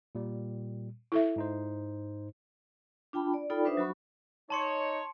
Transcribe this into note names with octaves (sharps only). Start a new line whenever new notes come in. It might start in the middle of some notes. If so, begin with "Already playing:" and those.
A#2 G3
E4 A4 E5
G#2 D#4 C5
D4 F4 G5 A5 B5
D5
D#4 F4 A4 D5 G5 B5
D4 B4 C5 E5 D#6
F#3 F#4 B5 C#6
D#4 C#5 A5 C6 C#7